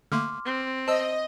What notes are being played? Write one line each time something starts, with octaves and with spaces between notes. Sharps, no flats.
D3 A3 A#3 C6 D6 F6
C4
C5 D#5 A5 E6